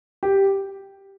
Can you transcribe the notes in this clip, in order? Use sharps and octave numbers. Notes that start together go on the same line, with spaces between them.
G4